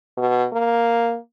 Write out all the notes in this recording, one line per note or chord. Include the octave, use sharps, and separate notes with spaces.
B2
A#3